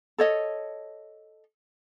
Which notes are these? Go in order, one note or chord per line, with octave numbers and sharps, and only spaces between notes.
A4 C#5 D#5